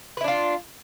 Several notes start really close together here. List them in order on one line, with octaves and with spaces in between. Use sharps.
B4 E4 D4 F4